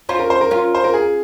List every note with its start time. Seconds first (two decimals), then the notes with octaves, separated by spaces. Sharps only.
0.09 C#4 F4 C5
0.19 A#4
0.30 C5
0.41 A#4
0.51 C#4 F4
0.75 C5
0.84 A#4
0.94 G#4